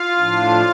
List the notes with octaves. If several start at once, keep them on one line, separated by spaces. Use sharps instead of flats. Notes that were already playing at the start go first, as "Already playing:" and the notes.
Already playing: F4 F5
A2 F3 D4